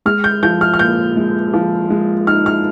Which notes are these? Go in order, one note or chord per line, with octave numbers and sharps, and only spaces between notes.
G#3 F6
G6
F3 G6
F6
F6
A#2 G6
G#3
F3
G#3
D#4 F6
F6